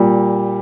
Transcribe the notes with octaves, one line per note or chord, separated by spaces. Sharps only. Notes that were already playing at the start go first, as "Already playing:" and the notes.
Already playing: A#2 G3